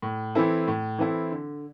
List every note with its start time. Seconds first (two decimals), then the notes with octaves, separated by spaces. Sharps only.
0.02 A2
0.35 E3 C4 E4 A4
0.68 A2
0.98 E3 C4 E4 A4
1.32 D3